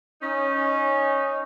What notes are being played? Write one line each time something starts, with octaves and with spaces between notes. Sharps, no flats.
C#4 D#4